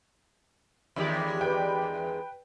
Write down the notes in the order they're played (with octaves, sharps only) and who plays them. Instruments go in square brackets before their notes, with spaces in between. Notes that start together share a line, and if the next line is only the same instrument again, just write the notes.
[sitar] E2 D#3 G#3 [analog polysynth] G4 D5 B5
[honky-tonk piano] B4 G5